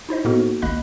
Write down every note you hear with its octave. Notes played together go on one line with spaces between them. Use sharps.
D#4 E4 C5 D#5
A2 A#3 B3 D#4 F#4 A4
G#1 C#2 A#3 D#5 B5 F#6